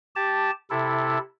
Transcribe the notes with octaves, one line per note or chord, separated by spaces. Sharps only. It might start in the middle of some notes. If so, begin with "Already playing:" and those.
G4 A5
C3 E4 A4